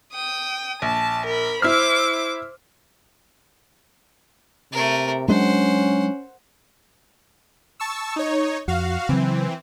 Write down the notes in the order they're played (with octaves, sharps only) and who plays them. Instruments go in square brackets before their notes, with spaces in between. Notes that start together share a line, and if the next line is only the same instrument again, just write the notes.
[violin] G5 D#6
[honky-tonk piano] A#1 [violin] A5
[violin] A#4 B5
[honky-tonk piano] E4 E6 F6 [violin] C5 D6
[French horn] C3 [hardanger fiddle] A3 A#4
[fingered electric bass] F#3 G#3 D4 [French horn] C#4 [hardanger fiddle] C5 F#5
[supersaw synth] A5 C#6 E6
D#4 C#5
[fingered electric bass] F2 [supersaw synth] F#4 F5
[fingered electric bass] C#3 F#3 [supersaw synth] E3 C4